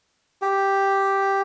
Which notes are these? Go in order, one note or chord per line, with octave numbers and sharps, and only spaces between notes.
G4